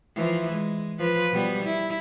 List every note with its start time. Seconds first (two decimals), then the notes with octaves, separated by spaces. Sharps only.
0.15 E3 F3
0.52 G#3
0.99 F3 B4
1.32 B2 G3 B3
1.64 E4